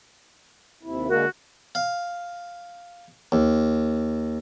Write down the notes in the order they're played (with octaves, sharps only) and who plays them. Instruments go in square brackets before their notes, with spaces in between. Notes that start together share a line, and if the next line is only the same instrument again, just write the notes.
[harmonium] D#2 C3 E4
[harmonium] D3 G#3 A#3 [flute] F#4 [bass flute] A#4
[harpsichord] F5
D#2